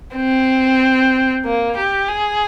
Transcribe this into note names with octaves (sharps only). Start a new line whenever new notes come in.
C4
A#3
G4
G#4